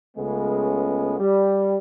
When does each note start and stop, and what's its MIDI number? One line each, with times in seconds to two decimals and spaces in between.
0.17 1.15 37
0.17 1.15 49
0.17 1.15 56
0.17 1.15 57
0.17 1.15 59
1.20 1.76 55